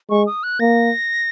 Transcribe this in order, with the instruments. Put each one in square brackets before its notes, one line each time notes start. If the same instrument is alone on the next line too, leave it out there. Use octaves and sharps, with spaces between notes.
[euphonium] G#3 [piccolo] C#6
[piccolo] D#6
F#6
[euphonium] A#3 [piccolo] A#6